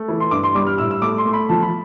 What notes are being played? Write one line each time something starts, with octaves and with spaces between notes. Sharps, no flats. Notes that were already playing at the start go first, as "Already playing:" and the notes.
Already playing: A3
E3
C6
G2 D6
C6
G3 D6
F6
A2 E6
E6
A3 D6
C6
A3
B5
F3 A5
B5